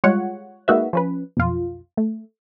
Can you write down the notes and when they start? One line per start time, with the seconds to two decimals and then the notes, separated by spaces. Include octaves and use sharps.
0.04 G3 G#3 F4 C#5 F#5
0.68 G#3 A#3 D#4 F#4 B4 E5
0.93 F3 C#4 B4
1.37 B1 F2 F4
1.97 A3